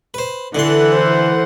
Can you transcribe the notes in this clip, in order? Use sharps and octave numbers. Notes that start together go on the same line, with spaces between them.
B4 C5
D3 E3 A4 F#5 C6
C5